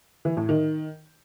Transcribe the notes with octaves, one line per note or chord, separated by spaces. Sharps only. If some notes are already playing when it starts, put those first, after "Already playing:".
E3
A2
D#3